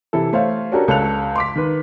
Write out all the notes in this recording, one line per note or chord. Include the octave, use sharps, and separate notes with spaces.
C3 E3 E4 A4
A3 C5 C#5 F5
C#4 D4 F#4 G4 A4 A#4
C#2 A4 C#5 F#6 F7
C6 D6 B6
D#3 B4